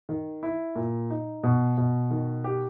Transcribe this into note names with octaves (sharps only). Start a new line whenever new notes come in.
D#3
E4
A#2
D#4
B2
B2
D#3
G4